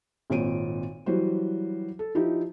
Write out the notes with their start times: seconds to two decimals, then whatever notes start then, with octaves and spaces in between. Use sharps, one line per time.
0.30 G#1 A#2 C4 C#5 D7 D#7
1.06 E3 F#3 G3 F#4 C5
1.99 A4
2.15 F3 D#4 E4 G4